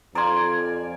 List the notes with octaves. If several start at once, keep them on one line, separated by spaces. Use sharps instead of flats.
F2 D5 F5 G#5 A#5 C6